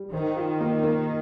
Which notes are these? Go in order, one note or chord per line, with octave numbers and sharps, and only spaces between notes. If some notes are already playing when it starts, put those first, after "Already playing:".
Already playing: G3
D#3 C5
F4
A#3
A#3